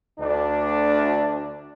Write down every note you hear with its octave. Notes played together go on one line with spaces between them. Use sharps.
D2 D4